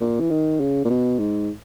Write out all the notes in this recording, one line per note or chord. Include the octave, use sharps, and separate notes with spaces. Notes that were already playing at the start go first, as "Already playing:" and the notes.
A#2
E3
D#3
C#3
A#2
B2
G#2